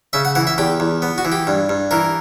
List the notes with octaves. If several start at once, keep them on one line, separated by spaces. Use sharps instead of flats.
C#3 E5
F#5
E3 F#5
E5
E2 G4
E2
B3
F#4
E3
G4
G2
G2
E3 A#4